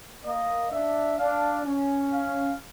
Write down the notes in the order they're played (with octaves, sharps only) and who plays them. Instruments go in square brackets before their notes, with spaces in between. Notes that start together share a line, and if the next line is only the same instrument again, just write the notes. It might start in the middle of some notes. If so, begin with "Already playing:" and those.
[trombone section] A#3 [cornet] D#5
[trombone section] D4 [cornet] E5
[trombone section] D4 [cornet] F5
[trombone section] C#4
[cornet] F5